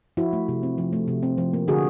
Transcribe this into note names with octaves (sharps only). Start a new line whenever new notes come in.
F3 E4 F#4
A3
C3
C4
F3
A3
C3
C4
F3
A#3
D3 F#4 G#4